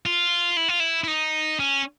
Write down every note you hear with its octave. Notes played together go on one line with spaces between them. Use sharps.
F4
E4
F4
E4
E4
D#4
C#4